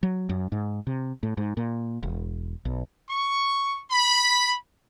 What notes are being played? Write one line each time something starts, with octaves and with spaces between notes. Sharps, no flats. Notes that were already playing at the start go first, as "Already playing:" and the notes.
F#3
F#2
G#2
C3
A2
G#2
A#2
E1
B1
C#6
B5